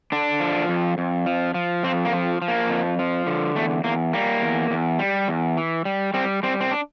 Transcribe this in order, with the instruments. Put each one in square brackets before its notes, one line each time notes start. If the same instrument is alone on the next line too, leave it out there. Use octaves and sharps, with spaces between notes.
[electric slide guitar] D3 D4
F3
F2
F2
F3
F3
F2 C4
A#3
F3
F3
A#3
F2
F3
D3
E2 A3
E2 A#3
G3 A#3
E2
E2
G3
E2
E3
G3
G3 C4
G3 C4
C4
D4